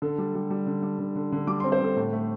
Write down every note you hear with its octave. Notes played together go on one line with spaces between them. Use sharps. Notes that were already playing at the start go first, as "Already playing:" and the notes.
D3 A4
G3
G3
G3
D3
G3
D3
D3
D3
G3 D6
C6
C4
C5
D3 A4
A2
A3